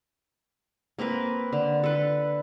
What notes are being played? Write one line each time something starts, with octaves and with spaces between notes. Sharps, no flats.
A#3 C4 A#4 B4
D3
A4 B4